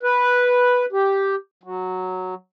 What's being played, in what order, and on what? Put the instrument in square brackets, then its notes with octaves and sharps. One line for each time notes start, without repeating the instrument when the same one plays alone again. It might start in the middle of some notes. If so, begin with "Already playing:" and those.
[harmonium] B4
G4
F#3